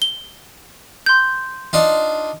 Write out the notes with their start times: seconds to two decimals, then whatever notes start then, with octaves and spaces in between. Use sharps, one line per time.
0.02 G7
1.06 C6 G6
1.73 D4 D#4 F4